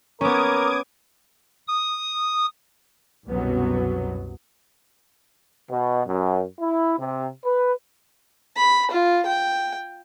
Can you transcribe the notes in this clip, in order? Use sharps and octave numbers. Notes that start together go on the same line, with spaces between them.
B3 C#4 A#4 D6 D#6 G#6
D#6
C2 F#2 B2 F#3 B3
B2
F#2
E4
C3
B4
B5
F4
G5